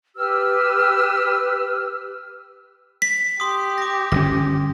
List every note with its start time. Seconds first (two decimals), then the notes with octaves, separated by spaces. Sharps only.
0.16 G4 B4 E6 F6
3.02 B6
3.40 G4 C6 D#6
3.78 D6 A#6
4.12 G1 C3 C#4 A#6